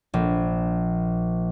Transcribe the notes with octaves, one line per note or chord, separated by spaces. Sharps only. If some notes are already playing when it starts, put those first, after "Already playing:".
A#1